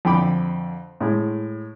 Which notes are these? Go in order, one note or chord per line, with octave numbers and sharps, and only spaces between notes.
F2 D3 G5 B5 D6
A2 G#3